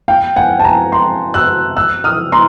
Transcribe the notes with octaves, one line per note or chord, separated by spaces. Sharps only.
F5 G5
F#5 G#5
A5
G#5 A#5
A#5 C6
E6 F#6
E6 F#6
D#6 F6
A#5 C6